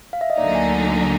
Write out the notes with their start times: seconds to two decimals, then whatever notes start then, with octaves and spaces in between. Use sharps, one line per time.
0.13 F5
0.21 E5
0.30 D#5
0.38 D2 D3 F#3 A#3 D#4 D5
0.55 G#5